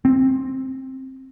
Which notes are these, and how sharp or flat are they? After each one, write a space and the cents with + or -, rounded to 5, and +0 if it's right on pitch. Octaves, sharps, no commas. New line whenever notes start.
C4 +15